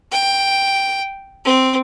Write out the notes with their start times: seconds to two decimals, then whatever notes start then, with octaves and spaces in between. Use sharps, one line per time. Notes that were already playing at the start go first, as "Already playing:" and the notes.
0.12 G5
1.45 C4